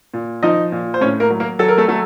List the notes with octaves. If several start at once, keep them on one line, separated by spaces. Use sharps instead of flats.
A#2
F3 D#4 D#5
A#2
C5
A2 C#4 C#5
A#3 A#4
F#3
A#3 A#4
F#3 A4
A#4
A3 A4
F#3 A3 A4